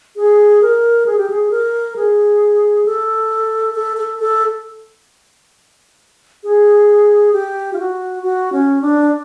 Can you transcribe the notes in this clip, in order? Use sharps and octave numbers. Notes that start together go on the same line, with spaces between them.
G#4
A#4
G#4
G4
G#4
A#4
G#4
A4
A4
A4
A4
G#4
G4
F4
F#4
F#4
C#4
D4